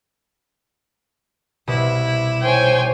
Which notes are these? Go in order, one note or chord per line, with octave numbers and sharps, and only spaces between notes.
C2 B2 E4
C5 C#5 G5 G#5